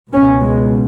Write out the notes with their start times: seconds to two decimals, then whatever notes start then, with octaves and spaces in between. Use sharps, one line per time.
0.13 C#2 B2 C#4
0.42 G#3